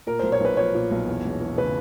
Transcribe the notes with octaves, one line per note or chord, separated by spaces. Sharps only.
A#2 A#4
B1 C5
C#5
B1 B4
F3 C#5
A#2
B1
E2
E1
E3
C#3 B4